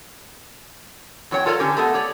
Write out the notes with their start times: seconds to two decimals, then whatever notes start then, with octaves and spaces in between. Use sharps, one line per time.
1.31 E2 F#3 C#4 C#5 G5
1.46 F4 A4 A#4 C#5 D5
1.59 D3 C#4 G4 A#4
1.77 A3 B3 A4 D#5
1.94 G4 C#5 D5